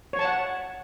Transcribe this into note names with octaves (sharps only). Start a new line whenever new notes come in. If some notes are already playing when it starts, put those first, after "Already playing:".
C#5
A5
F#5